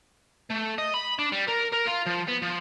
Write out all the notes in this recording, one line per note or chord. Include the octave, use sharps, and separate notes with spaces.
A3
D#5
B5
D4
G3
A#4
A#4
F4
F3
B3
F3